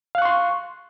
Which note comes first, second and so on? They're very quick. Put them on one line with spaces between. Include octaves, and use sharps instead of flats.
F5 F#6 C#6 C6